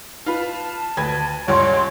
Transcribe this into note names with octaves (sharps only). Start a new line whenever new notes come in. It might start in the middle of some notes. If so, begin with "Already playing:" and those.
F4 B4 A5
D2 B4 G#6
C#2 G2 C#3 C#5 C6